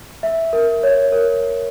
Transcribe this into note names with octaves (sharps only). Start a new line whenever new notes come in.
E5
A#4
C#5
A#4